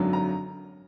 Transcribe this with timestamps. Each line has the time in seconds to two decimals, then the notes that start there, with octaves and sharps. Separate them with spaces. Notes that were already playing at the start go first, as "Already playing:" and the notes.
Already playing: G#1 F#2 D3 F#3
0.13 A#5